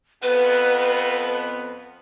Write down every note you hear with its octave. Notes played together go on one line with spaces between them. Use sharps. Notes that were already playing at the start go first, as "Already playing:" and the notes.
F2 B3 B4